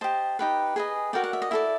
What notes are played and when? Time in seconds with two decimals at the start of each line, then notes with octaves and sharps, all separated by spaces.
0.01 G4 C5 D#5 A5
0.39 D#4 G4 B4
0.76 G#4 B4 D#5 G#5
1.13 F#4 A#4 D5 G5
1.24 F#5
1.33 E5
1.42 D#5
1.51 E4 A4 D5 E5